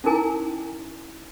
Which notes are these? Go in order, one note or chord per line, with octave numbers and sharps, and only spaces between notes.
C#4 D#4 E4 A#4 G#5 A#5